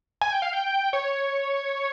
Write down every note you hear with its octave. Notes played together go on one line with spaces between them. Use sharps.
G#5
G5
F5
G5
C#5